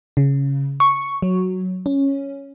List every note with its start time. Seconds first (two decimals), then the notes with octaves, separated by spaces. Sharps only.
0.17 C#3
0.80 C#6
1.22 F#3
1.86 C#4